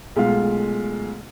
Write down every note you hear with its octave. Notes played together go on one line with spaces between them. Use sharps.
B1 G#3 A3 F4 F5